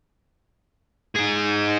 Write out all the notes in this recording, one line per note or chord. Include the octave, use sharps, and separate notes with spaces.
D#4 G#4